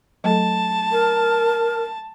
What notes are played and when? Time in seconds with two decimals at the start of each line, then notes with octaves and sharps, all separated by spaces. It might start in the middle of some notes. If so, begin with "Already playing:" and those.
0.24 F#3 A3 A4 A5
0.92 A#4